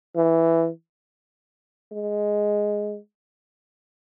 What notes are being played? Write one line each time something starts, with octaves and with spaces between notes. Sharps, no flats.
E3
G#3